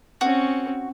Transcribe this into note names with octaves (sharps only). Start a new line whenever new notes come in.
C4 C#4 F#4